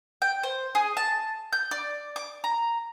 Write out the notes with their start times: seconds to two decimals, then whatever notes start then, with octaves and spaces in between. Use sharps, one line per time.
0.22 G5
0.43 C5
0.75 G#4
0.97 A5
1.53 G6
1.71 D5
2.16 D6
2.44 A#5